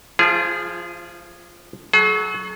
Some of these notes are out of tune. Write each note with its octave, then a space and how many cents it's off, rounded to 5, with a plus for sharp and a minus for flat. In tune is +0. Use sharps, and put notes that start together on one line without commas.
F3 +0 F4 -40 G#4 +0
F#3 +0 G#4 +45